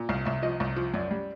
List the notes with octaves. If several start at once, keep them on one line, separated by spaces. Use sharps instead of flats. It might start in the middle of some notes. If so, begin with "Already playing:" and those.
Already playing: A#2
C2 F5
C2 E5
F3 D#5
C2
F3
F#2 D5
G3